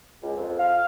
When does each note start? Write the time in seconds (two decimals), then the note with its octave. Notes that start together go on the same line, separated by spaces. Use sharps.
0.23 C#2
0.37 F2
0.59 F5